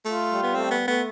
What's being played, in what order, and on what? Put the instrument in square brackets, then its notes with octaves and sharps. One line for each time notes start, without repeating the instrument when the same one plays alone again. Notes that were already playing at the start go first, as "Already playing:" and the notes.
[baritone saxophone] A3 [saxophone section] F4
[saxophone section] G3
[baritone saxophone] B3
[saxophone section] A3 [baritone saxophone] C4
[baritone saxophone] B3
[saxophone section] A3
[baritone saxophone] B3